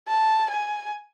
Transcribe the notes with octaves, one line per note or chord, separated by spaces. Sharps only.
A5
G#5